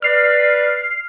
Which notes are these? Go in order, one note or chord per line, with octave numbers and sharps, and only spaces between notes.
B4 D5 F6 C7